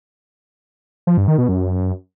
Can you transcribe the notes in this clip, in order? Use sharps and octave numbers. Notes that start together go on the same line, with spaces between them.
F3
G2
D#3
B2
F#2